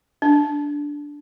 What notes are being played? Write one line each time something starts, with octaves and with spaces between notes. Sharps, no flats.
D4